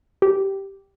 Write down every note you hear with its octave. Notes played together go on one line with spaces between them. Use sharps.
G4